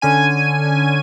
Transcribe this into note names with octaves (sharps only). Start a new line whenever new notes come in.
D3 C#4 G#5 D#7